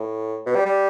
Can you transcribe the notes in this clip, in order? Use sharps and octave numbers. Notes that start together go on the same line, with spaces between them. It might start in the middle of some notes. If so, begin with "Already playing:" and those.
Already playing: A2
B2
G3
G3